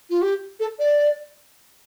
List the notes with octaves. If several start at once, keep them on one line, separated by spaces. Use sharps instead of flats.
F4
G4
A4
D5